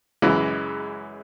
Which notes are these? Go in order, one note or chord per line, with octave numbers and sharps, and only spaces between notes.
F#2 C#3 E3 G#3